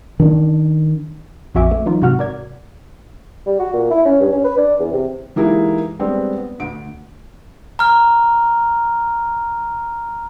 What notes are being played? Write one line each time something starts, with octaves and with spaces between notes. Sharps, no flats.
D#3 D4
A#1 F2 F#4 E5 G#5 D6
A3
E3 F#3 D#4 F4
G#2 C3 F#4 F#5 F6
A#4 D5 G#6
G3
F#4
A#2
E4
C#4
G2
C#4
B4
D4
E2
C3
E3 G#3 A#3 D#4 E4 G4
G3 G#3 B3 C4 D4
B3
D2 D7
A#5 F6